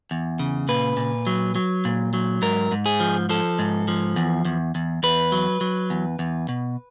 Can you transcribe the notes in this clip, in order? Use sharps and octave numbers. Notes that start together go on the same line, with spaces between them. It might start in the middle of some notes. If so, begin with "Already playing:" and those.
E2
C#3
A#2 B4
A#2
F#3
F#3
A#2
F#3
G#2 A#4
G#2
G#4
F3
F3 A4
G#2
F3
E2
E2
E2
E2 B4
F#3
F#3
E2
E2
B2